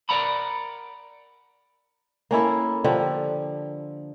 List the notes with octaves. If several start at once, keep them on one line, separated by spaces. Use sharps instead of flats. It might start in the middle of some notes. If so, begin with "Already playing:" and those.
A#4 D5 F#5 A#5 B5
A#3 C#4 E4 A4
D3 F3 G4